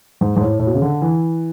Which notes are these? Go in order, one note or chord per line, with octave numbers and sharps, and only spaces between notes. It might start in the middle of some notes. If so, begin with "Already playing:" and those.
G#2
G#2
A2
A2
B2
C#3
D3
E3